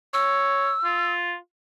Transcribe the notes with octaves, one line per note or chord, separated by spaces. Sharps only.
C#5 E6
F4